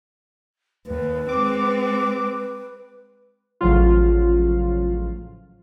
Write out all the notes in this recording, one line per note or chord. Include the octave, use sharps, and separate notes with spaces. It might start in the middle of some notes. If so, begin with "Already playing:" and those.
D#2 B4
G#3 C4 D6
A1 C#3 F3 F#3 F4